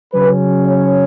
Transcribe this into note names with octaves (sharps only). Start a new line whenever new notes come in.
C#3 F#3 C#4 B4
C#5